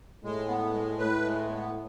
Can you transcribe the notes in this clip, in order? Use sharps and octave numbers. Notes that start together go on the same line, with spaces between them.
A2 G#3
B3
G#3
A2 B4
G#3
B3